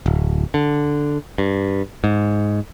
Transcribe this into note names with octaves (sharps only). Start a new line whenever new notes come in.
D1
D3
G2
G#2